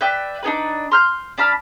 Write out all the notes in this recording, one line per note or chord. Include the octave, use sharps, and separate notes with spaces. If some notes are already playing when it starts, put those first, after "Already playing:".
B4 D5 E5 G5
D4 D#4 G#4 B4
C6 F6 G6
D4 A5 B5 F6